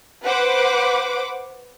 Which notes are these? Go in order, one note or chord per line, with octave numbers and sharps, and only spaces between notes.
B4 C5 F#5 D6